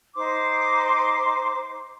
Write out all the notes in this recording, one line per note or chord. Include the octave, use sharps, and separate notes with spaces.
D#4 C5 C6 D6